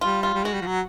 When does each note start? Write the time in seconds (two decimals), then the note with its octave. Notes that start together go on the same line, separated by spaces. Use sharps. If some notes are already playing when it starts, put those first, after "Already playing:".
0.01 G3 F4
0.23 F4
0.34 G3
0.44 G#3 F#4
0.54 G3
0.61 F3
0.66 F#3